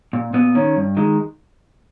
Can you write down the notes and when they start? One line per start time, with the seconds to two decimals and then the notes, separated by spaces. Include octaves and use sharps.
0.13 A#2
0.33 A#2 B3
0.55 D#3 C#4
0.76 G2
0.97 D#3 G#3